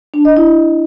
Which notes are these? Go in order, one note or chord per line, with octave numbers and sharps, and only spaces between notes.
D4
D#5
E4